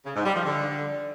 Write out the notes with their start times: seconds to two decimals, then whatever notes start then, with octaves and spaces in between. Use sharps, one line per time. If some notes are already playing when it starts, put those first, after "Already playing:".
0.06 C#3
0.16 G#2
0.25 G3
0.35 F3
0.45 D3